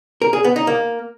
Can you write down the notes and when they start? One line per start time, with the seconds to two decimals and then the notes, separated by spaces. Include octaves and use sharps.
0.22 A#4
0.33 G#4
0.44 B3
0.56 D#4
0.67 A#3